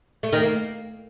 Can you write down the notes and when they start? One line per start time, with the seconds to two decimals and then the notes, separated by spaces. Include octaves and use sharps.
0.23 A3
0.33 D#3
0.42 A#3